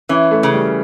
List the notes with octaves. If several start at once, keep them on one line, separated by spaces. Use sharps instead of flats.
E3 C#4
A3
C#3
G3